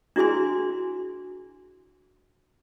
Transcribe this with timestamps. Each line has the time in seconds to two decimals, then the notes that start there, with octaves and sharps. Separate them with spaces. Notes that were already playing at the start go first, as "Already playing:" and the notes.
0.16 D4 E4 F#4 G#4 G#5 C6